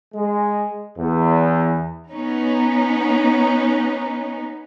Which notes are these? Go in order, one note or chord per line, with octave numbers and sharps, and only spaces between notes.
G#3
E2
B3 C#4 D#4